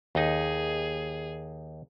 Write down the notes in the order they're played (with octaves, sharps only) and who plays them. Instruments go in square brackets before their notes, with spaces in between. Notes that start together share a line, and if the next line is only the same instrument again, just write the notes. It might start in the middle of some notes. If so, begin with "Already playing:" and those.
[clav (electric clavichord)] D#2 D#4 [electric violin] G#4